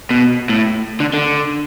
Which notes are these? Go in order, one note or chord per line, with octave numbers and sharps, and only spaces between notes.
B2
A2
D3
D3